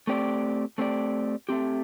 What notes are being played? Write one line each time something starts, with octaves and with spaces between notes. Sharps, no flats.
A3 C4 G4 D5
A3 C4 G4 D5
A3 C4 G4